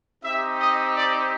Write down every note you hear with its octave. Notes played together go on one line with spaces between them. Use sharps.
C4 D#4 G4 E5
D#5
D5